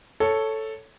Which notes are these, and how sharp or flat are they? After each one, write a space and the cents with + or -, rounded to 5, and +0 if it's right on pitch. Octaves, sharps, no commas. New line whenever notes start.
A4 +0 C#5 +0